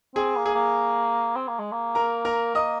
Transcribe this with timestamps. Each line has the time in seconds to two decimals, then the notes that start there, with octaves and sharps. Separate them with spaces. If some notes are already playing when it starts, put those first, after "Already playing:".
0.15 C4 G#4 G#5
0.36 A#3
0.45 G#4 G#5
0.55 A#3
1.36 C4
1.47 A#3
1.59 G#3
1.72 A#3
1.95 A#4 A#5
2.25 A#4 A#5
2.55 A#3 D#5 D#6